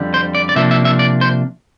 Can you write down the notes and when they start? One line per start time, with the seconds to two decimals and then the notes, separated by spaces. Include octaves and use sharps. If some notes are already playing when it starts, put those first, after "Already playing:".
Already playing: F2 D3 G3
0.14 C5
0.35 D5
0.49 D5
0.56 C3 F3 A#3 D4 E5
0.71 E5
0.85 E5
0.99 D5
1.21 C5